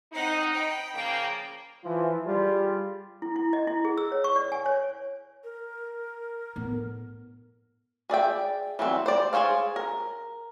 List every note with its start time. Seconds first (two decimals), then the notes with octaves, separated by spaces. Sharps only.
0.13 C4 D#4 F#5
0.54 G5 B5
0.94 C#3 F3 A#3 G5
1.84 E3 F3
2.26 G3 F4 G#4
3.22 E4
3.36 E4
3.53 D#5
3.67 E4
3.85 G#4
3.98 E6
4.12 C#5
4.24 C#6
4.36 D5
4.52 G#5
4.66 C#5
5.44 A#4
6.56 A2 B3
8.10 G#4 D5 E5 G5
8.79 E3 F#3 G3 C4
9.06 C5 D5
9.33 G#4 A4 C5 C#5 F5
9.76 A#4